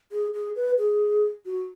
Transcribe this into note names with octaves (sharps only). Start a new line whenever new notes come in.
G#4
G#4
B4
G#4
F#4